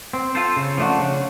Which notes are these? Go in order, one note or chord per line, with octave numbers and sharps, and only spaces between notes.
C4
F4 A4 C5
C#3
F3 A3 D4 F#4
C#3